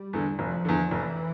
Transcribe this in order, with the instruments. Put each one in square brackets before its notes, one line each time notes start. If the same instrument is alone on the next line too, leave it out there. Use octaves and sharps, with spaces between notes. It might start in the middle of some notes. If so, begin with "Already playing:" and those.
Already playing: [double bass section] G3
[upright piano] E2 D3
[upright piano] F1 [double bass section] F3
[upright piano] E2 D3
[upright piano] F1 [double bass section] E3